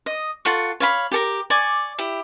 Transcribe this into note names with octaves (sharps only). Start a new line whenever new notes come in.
D#5
F4 A4 F#5 C#6
C#5 F5 B5
G4 A4 A#4
D5 G#5 C#6
E4 G4